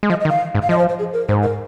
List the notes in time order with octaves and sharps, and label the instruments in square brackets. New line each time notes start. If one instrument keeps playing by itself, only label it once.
[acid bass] G#3
[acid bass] F3 [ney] D#5
[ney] D#5
[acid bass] D#3
[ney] F5
[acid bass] G#2
[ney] F5
[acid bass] F3 [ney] D#5
[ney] C5
C5
G#4
A#4
[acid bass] G#2 [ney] C5
[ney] A#4